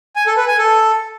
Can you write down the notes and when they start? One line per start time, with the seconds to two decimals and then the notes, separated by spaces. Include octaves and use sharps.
0.16 G#5
0.26 A4
0.37 B4
0.48 G#5
0.58 A4